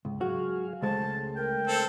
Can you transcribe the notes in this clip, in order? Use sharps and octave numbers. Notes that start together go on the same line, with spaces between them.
C#2 G#2
F#3 F#4 G#4 F5
C#2 G#3 A3 C5 A5
A#4 G5
A3 C4 A4 C5